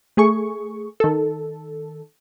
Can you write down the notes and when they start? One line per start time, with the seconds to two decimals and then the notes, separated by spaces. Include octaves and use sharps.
0.17 A3 G#4 C#6
1.00 D#3 A4